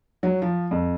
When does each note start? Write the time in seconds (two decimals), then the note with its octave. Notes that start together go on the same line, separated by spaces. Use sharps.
0.23 F#3
0.42 F3
0.71 F2